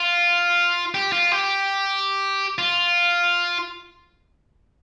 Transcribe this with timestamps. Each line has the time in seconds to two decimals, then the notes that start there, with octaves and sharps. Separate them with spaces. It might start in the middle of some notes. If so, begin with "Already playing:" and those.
Already playing: F4
0.95 G4
1.12 F4
1.32 G4
2.58 F4